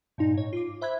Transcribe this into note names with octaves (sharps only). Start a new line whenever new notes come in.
G2 A#2 D#4
G#2 C#5
F4 D6
C5 E5 B5 F#6 G#6